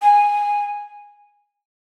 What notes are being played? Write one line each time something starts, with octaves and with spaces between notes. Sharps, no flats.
G#5